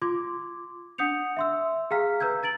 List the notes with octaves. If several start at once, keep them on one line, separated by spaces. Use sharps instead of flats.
F4 C6 D6 G#6
D4 F#5 D#6 G6 C#7 F7
E5 C6 E6
G#4 F5 G5 A#5 F6 B6
B4 A#5 E6 G6 G#6
A#5 A6 D7 F#7